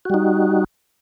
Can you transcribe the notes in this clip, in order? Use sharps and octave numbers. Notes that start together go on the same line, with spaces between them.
G3 D#4 F#4